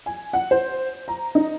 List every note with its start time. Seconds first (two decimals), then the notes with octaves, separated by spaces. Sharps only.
0.06 G#5
0.33 F#5
0.51 C5
1.08 A#5
1.35 D#4